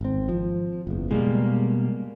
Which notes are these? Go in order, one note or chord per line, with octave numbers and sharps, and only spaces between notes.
G#1 C4
F3
F#1 E2
B2 G3 G#3 A#3